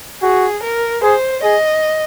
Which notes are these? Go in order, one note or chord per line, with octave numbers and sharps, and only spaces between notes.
F#4 G#4
A#4
G#4 C5
G#4 D#5